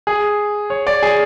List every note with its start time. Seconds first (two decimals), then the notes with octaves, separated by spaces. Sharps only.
0.07 G#4
0.70 C#5
0.87 D5
1.03 G#4